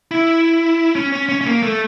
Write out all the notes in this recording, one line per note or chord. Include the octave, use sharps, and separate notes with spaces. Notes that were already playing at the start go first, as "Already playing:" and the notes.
E4
C#4
C#4
C#4
C#4
A#3
A3